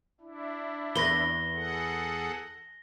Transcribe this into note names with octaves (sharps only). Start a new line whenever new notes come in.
D4 E4
E2 B4 A#6 G7
G#4 A4 F#5